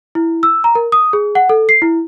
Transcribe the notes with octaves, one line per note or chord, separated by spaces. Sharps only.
E4
E6
A#5
A#4
D#6
G#4
F#5
A4
C7
E4